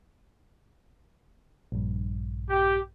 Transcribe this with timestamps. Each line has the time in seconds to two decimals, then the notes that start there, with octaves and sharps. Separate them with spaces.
1.72 A#1 G2
2.50 G4